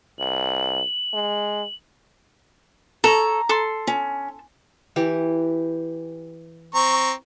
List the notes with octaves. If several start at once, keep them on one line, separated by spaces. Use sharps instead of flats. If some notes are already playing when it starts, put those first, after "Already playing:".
C2 F#7
G#3
A4 C#5 A#5
A4 C6
C#4
E3 G4
C4 A#5 C#6